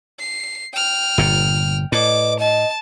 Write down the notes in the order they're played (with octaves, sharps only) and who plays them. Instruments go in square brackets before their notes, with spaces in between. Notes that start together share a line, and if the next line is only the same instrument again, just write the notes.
[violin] C7
G5 F6
[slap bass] G1 A#2
[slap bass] A2 [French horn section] B4 D5 D#5 [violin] D6
[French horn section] D#5 [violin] A5